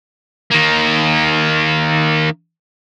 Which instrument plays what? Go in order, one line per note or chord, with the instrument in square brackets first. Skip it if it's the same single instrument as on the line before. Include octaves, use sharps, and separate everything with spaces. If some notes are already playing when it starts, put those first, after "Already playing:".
[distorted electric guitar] D#3 A#3